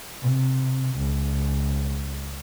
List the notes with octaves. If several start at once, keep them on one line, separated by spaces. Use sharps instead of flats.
C3
C#2